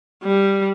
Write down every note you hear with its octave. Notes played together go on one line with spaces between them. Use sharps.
G3